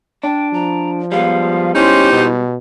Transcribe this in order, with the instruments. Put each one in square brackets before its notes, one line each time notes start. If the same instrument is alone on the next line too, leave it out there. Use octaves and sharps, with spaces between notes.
[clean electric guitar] D4 [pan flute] G5
[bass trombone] F3 [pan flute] A#5
[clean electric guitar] G3 G#3 B3 [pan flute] F5
[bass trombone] C#4 [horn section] D#4 G4 C5 [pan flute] E4
[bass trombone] B2